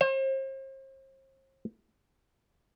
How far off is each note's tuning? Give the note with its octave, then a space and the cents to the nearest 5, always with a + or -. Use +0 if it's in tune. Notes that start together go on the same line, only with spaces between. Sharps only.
C5 +40